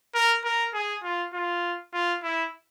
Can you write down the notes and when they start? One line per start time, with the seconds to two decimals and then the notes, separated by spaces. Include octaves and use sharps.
0.14 A#4
0.44 A#4
0.74 G#4
1.03 F4
1.34 F4
1.93 F4
2.23 E4